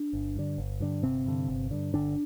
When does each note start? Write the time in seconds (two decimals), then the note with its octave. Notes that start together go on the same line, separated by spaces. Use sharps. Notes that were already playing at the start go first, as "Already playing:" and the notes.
Already playing: D4
0.13 G1
0.36 G2 D3
0.58 G1
0.80 G2 D3
1.03 G1 C3 C4
1.26 G2 D3
1.48 G1
1.71 G2 D3
1.94 G1 D3 D4